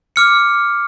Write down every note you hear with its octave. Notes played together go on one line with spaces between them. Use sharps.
D6 F6 C#7